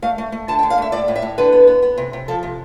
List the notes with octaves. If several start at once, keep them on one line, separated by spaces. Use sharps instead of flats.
A3 F5
A3
A3
D3 A5
G5
D3
F5
A3 E5
A2 D5
A2
E5
A2
D3 B4
B3
B3
B3
C3
C3
F3 A4
C3